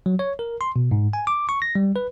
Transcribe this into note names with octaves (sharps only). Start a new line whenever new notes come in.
F#3
C#5
A#4
C6
B2
G#2
G#5
D6
C#6
A#6
G3
B4